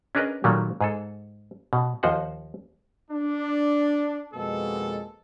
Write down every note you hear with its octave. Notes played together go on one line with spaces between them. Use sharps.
C#4 D4 G#4 A#4 B4 D#5
A#2 D#3 F#3 G3 A3 A#3
G#2 G#4 A4
B2
D#2 F3 C5 D#5 F#5
D4
F2 B2 G#3 A#3 A4